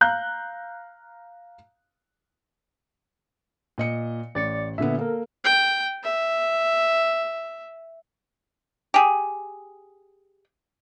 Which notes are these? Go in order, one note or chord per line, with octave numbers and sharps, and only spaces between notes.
F5 A#5 F#6 G6
A#2 D#5 C#7
A1 D5 A6 C#7
A#2 D3 B3 E5
A#3 A4 A#4
G5
E5
G4 G#4